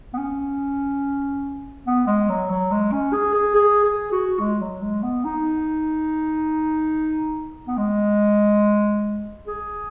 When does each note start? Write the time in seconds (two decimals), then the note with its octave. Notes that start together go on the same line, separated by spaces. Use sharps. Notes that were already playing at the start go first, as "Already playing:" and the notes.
0.13 B3
0.18 C#4
1.87 B3
2.07 G#3
2.29 F#3
2.50 F#3
2.72 G#3
2.92 C#4
3.13 G#4
3.34 G#4
3.55 G#4
3.84 G#4
4.12 F#4
4.39 G#3
4.61 F#3
4.82 G#3
5.03 B3
5.24 D#4
7.68 B3
7.78 G#3
9.47 G#4